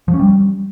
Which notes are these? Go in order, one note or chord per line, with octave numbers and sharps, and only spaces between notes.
F3
C#4
G3